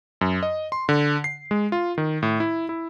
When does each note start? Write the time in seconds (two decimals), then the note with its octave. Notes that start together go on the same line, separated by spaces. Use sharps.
0.21 F#2
0.43 D#5
0.72 C6
0.89 D3
1.24 C7
1.51 G#3
1.72 F4
1.98 D#3
2.23 A2
2.40 E4
2.69 E4